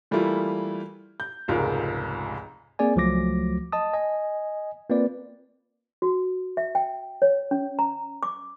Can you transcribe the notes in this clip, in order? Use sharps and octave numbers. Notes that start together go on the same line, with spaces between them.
E3 G3 A3 A#3 E4 F4
G6
F1 C#2 G#2 F4 A#4
A#3 C4 G#4 D5 G#5
C#2 F3 F#3 A3 D6 A#6
D#5 A5 D#6
D#5 G#5
A#3 C4 F4 B4 D5
F#4
E5
G5
C#5
C#4
A#5
D6